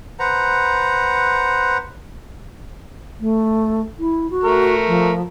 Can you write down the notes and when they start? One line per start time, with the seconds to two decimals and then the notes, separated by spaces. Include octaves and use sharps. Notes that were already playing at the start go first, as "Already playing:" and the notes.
0.19 B4 C5 F#5 A#5
3.20 A3
3.99 E4
4.31 F#4
4.44 A3 A#4
4.87 F3